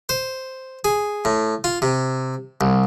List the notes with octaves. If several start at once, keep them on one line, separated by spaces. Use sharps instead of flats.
C5
G#4
A2
F4
C3
C2